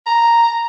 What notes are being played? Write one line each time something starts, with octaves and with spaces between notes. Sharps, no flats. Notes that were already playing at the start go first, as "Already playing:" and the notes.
A#5